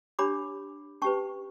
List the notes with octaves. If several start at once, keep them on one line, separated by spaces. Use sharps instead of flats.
D4 G4 C#5 B5 D6
C#4 G4 B4 A5 C#6